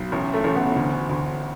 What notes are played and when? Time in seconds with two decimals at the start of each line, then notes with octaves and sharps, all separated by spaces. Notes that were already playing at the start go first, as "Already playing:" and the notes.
Already playing: B1
0.12 A1
0.34 A3
0.44 A1 A3
0.55 B3
0.76 D2
1.09 D2